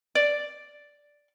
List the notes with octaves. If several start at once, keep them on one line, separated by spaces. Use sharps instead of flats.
D5